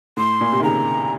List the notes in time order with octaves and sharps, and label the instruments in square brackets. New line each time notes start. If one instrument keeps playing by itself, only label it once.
[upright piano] A2 [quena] C6
[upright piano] A#2
C3
D#3
[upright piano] C#3 [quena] A#5